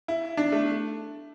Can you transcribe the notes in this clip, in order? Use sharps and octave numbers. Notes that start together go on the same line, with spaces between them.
E4
D4
A3